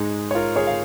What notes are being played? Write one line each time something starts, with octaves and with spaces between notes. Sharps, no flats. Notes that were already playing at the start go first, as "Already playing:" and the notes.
Already playing: G#2 G#3 D#4 G#4
C#5
F4 A#4
G#4 C#5
F5